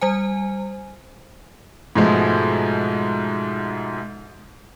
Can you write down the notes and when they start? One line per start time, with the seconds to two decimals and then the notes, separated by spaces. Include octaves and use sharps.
0.01 G3 C5 G#5
1.95 G#2 B2 F3 G#3 A3